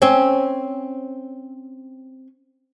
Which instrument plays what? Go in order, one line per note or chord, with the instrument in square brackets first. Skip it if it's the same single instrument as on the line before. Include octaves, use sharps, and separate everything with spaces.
[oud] C4 C#4